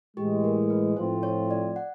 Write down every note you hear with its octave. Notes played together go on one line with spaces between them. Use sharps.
A2 E3 G#3 G4
A#4
B4
A2 F3 A3 C4 F4 C5
C#5
D5
F#5